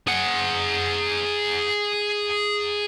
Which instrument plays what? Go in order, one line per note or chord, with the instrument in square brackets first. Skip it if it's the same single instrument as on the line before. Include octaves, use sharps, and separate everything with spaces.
[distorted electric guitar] G#4 F#5